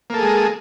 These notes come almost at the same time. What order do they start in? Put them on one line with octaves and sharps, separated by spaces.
A#3 A4 G#4 G#3